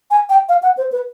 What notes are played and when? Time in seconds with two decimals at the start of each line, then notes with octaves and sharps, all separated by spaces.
0.11 G#5
0.30 G5
0.49 F5
0.63 F#5
0.77 C5
0.92 B4